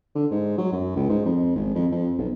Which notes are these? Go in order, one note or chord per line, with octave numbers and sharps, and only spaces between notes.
D3
G#2
F#3
F#2
C#2
G#2
F2
G#1
F2
F2
B1